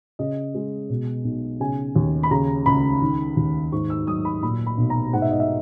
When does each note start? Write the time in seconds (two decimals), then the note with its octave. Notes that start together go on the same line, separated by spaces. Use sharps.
0.19 C#3 D#5
0.55 G#3
0.90 B2
1.25 B1
1.60 C#3 G#5
1.96 D#2
2.23 B5
2.31 C#3 A#5
2.66 C#2 B5
3.02 D#3
3.37 D#2
3.72 G#2 C#6
3.90 E6
4.07 F#3 D#6
4.25 B5
4.43 A#2 B5
4.66 B5
4.78 B1
4.90 A#5
5.13 G#2 F#5
5.22 E5
5.31 D#5
5.40 E5